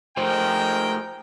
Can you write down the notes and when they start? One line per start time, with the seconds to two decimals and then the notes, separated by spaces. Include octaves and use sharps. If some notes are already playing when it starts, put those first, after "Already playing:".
0.17 G#3 A3 F4 A#4 C5 G5